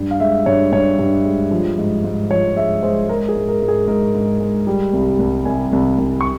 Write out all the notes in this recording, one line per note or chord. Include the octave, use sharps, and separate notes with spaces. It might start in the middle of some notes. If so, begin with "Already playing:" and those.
Already playing: G2
F5
G#3 E5
G2 C#5
G2 C#5
G2
G#3
F3
G#2
G#2
F3 C#5
G#3 E5
G#3 C5
G#3 A#4
G#4
G#2
A#4
G#2
G#4
G#2 A#4
G#2
G#3
G3
C2
C2
C2 G#5
C2
C2
C#6